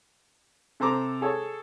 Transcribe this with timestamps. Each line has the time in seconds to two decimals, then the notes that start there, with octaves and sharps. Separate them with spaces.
0.80 C3 A4 C5 A#5 D6
1.21 G#4 A4 C#5